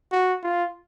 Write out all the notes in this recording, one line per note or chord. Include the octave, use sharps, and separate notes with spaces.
F#4
F4